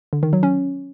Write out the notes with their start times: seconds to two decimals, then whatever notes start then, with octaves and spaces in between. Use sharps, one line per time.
0.13 D3
0.23 D#3
0.33 F#3
0.43 C#4